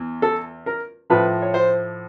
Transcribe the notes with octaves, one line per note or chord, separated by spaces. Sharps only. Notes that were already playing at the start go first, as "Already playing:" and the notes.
Already playing: E2
A4
A#4
A2 F3 B4
C#5
C5